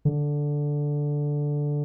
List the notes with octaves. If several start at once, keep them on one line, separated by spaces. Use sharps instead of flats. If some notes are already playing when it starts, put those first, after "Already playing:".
D3